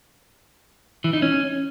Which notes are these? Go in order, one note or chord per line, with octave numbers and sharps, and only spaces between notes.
E3
D#4
C#4